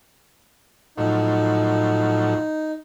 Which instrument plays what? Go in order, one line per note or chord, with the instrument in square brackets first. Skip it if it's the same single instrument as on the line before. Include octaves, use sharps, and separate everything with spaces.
[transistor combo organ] A2 F3 F#3 [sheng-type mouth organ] D#4